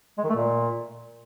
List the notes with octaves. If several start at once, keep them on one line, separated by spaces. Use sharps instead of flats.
G#3
D#3
A3
A#2